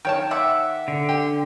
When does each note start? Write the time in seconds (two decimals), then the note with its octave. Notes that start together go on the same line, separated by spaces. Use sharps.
0.05 D#3 C#5 G5 A5
0.31 E5 F#5 D6
0.88 D3
1.09 G4